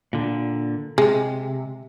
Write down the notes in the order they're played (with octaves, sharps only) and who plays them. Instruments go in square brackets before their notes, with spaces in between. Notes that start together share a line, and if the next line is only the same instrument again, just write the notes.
[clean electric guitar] A#2 D3
[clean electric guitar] C3 [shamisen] G#3